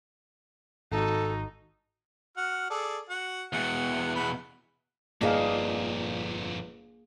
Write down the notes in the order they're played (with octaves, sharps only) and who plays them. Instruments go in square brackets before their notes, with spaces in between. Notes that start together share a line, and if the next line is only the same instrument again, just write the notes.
[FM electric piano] G#1 [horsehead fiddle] D#4 F#4 [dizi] A4
[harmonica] F#4 F#5 F6
G#4 A4 D5
F#4 F#5
[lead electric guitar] E2 B2 [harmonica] F#5
[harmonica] F#5 B5
[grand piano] G1 [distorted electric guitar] F2 A#2 [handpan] A#3 G#4 F5 [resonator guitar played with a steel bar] D4 D#4